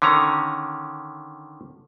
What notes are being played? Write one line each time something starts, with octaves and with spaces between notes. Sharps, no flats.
D3 D#3 C#4 A#5